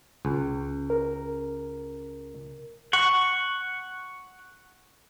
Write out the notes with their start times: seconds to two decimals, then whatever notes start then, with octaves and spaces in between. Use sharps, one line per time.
0.25 C#2
0.90 A#4
2.93 F#5 C#6